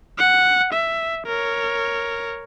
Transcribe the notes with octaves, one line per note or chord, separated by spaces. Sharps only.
F#5
E5
A#4 C#5